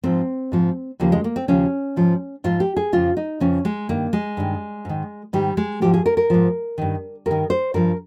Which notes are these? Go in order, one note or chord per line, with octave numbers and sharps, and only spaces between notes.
G#2 F3 C4
G#2 F3
D#2 C#3 F3 A#3
G#3
A#3
C4
D#2 C#3 F3 C#4
G#2 F3
G#2 F3 F4
G4
G#4
F2 C#3 F3 F4
D#4
F2 C#3 F3 C#4
G#3
G2 D#3 A#3
G#3
G2 D#3
G#2 D#3
G#2 D#3 G3
G#3
G#2 F3 G4
G#4
A#4
A#4
G#2 F3
G2 D#3
G2 D#3 A#4
C5
G2 F3 A#4